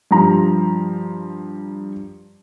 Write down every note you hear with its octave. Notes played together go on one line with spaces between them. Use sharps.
G2 F3 A#5